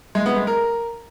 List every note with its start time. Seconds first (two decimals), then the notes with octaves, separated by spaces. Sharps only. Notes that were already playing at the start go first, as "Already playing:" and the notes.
0.15 G#3
0.26 B3
0.36 G#3
0.47 A#4